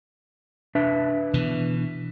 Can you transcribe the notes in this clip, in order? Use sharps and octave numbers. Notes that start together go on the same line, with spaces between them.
D4 B4 E5
B2 E3